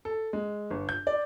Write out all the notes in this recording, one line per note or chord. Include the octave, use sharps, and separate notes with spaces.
A4
G#3
G1
G6
D5